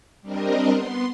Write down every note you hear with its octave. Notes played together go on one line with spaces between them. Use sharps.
G3 C4 D4 A#4 D#5
B3 C6